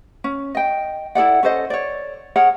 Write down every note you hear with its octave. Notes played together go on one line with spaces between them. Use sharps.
C#4
D#5 G5
E4 A4 D5 F#5
C#4 A4 C5 D#5
C#5 D5
G#4 A#4 C#5 F#5